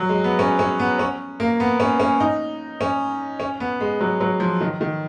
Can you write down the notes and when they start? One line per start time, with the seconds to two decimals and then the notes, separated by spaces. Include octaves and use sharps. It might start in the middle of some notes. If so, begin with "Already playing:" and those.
Already playing: F#3
0.09 G#3
0.24 B3
0.39 C#4
0.59 C#4
0.79 B3
0.99 C#4
1.40 A#3
1.60 B3
1.80 C#4
2.00 C#4
2.20 D#4
2.81 C#4
3.40 C#4
3.60 B3
3.81 G#3
4.01 F#3
4.21 F#3
4.40 F3
4.61 D#3
4.81 D#3